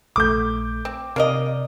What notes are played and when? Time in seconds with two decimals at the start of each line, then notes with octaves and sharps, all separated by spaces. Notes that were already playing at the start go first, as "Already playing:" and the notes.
0.16 A#1 A3 D6 G6
0.85 C4
1.16 C3 A#3 A#4 D5 D#5